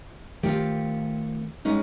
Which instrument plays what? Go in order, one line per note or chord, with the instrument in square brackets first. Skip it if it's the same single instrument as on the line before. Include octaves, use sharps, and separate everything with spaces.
[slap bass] D#3 A3 [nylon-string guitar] C4 F4 G4
[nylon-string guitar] G#3 C#4 D#4